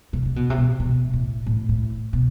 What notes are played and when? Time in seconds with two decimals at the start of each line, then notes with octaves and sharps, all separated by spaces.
0.13 C3
0.25 C3
0.36 B2
0.50 C3
0.58 B2
0.80 B2
1.13 A2
1.46 A2
1.69 A2
2.13 B2